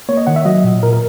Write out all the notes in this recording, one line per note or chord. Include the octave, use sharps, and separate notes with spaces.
A#3 C#5
D#5
D#3 F#5
E5
F#3 D#5
A#2
A#2 A#4
A#4